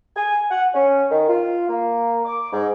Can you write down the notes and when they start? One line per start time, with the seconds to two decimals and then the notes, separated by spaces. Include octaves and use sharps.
0.16 G#5
0.51 F#5
0.74 C#4
1.11 D#3
1.29 F4
1.68 A#3
2.25 D6
2.52 G#2